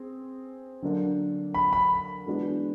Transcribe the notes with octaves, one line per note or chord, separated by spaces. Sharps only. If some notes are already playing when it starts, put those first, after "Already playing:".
Already playing: C4 G#4
D3 F#3 A#3 D4
B5
B5
E3 G#3 B3 D4 F#4